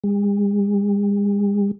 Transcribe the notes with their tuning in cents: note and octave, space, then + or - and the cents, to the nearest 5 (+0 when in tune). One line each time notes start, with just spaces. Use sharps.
G#3 -45